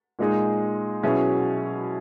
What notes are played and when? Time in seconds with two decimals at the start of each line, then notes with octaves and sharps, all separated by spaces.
0.19 A#2 G#3 D#4 G#4
1.03 B2 F#3 C#4 E4 G#4